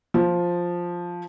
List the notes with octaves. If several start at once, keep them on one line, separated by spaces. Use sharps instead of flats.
F3